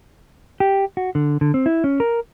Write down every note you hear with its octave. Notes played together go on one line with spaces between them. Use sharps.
G4
F#4
D3
D3
C4
E4
C#4
A#4